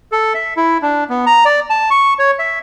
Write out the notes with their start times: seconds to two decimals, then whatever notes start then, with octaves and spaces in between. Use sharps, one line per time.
0.12 A4
0.34 E5
0.57 E4
0.82 D4
1.09 B3
1.26 A#5
1.45 D5
1.70 A5
1.90 C#6
2.19 C#5
2.39 E5